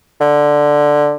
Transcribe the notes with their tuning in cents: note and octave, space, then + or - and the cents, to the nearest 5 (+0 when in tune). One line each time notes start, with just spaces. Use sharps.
D3 +5